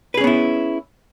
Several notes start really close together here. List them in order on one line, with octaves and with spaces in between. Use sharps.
B4 G#4 C#4 B3 E4